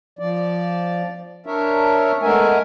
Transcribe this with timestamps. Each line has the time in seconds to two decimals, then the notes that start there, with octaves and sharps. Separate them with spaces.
0.19 F3 D5
1.46 D4 A#4 C#5 E5
2.22 G#3 A3 B3 A#4 E5 G#5